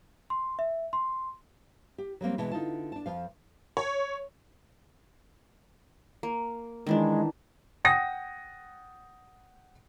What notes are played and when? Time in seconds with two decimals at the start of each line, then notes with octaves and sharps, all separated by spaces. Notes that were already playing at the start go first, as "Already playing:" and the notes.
0.30 C6
0.59 E5
0.93 C6
1.98 G4
2.21 F#3 G3 A#3 C4
2.38 B2 E3 G#3 A5
2.51 D3 D#4 F4 A5
2.92 D4 A5
3.06 F2 F3 F5
3.77 C#5
6.23 A#3
6.87 D#3 E3 G#3 D4
7.85 F#5 G5 D#6 A#6